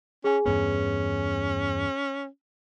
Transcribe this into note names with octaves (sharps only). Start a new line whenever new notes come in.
C#4 G#4 G#5
E2 G2 B3 C#4